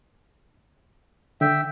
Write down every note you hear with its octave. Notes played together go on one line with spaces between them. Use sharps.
D3 E5 G5